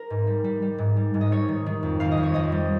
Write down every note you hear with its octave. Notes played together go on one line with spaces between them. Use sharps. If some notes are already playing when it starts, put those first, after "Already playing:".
Already playing: A#4
G#2
G3
G3
G3
G#2
G3
G#2
D#5
G3 C#5
D#3
D#3
F2
F2 F5
D#5
F2
C#5
F2 D#5
G3